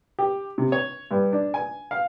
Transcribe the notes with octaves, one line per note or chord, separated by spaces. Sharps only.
G4
C3
C#5
G2
D4
G#5
F5